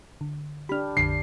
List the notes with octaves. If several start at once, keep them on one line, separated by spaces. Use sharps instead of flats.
D3
D4 G4 B5 F6
A#1 F2 D3 C7